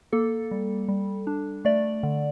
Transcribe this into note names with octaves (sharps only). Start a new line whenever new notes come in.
A#3 A4
G3
G3
D4
A3 D5
D3